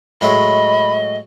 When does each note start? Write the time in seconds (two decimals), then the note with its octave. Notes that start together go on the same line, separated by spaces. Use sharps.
0.21 A2 F#3 G#3 D#5 B5